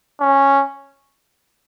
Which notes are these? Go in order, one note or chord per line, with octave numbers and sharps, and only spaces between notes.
C#4